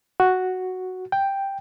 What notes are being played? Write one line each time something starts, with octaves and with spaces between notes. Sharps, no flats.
F#4
G5